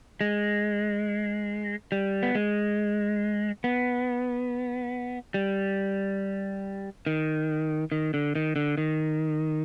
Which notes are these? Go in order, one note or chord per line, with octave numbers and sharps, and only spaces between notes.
G#3
G3
B3
G#3
B3
G3
D#3
D#3
D3
D#3
D3
D#3